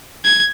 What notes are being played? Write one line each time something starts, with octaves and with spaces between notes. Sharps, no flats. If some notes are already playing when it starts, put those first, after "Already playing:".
G#6